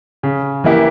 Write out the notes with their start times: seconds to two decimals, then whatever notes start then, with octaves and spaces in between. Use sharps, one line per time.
0.23 C#3
0.64 E3 A#3 E4 G4